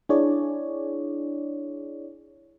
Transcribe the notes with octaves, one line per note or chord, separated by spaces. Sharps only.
D4 E4 G#4 C#5 D5